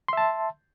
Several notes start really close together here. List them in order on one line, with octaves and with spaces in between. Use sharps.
C6 E5 A5